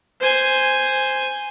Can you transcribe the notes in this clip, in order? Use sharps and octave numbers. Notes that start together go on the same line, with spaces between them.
C5 G#5